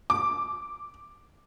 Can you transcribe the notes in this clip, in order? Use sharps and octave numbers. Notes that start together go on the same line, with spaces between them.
D6